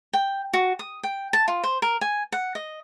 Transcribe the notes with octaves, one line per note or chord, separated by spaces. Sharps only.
G5
F#4
D#6
G5
A5
F4
C5
A#4
G#5
F#5
D#5